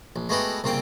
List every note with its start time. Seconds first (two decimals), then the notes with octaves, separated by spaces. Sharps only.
0.16 A#1
0.29 G#3 A3 B3 F#4 G4
0.64 C2 A#2 C#3 C4 G5